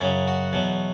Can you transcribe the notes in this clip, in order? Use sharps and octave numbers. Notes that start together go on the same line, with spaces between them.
F#2 C#3 F#3 C#4
F#4
E2 B2 F#3